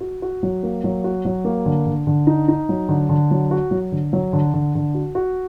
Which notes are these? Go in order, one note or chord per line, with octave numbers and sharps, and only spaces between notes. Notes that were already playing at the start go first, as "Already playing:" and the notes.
F#4
F#4
F#3
A#3
F#3
F#4
F#3
A#3
D3
D3
D3
D#4
D#4
F#3
D3
D3
F#3
F#4
F#3
D3
F#3
D3
D3
D3
F#4
F#4